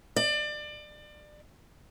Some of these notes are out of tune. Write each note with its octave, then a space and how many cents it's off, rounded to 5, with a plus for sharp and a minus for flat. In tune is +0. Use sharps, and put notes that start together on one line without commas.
D5 +30